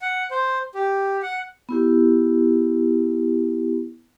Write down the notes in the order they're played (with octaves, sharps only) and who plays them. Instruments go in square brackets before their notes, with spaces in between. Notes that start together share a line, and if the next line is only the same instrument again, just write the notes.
[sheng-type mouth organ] F#5
C5
G4
F#5
[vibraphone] B3 E4 G4